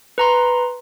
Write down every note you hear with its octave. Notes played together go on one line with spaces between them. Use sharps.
B4 A#5 C6